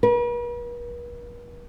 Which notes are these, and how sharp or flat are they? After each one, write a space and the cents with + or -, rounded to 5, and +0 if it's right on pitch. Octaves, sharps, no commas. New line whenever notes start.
B4 -45